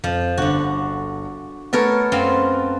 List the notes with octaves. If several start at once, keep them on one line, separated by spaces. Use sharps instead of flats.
F2 F3
G1 D3 F#4
A3 B3 A4 A#4 C#5
F#2 C4 F4